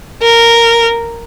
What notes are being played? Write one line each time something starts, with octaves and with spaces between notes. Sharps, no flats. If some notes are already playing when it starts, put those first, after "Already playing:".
A#4